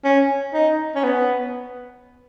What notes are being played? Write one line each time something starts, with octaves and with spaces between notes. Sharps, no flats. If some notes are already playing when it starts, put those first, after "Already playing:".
C#4
D#4
C#4
B3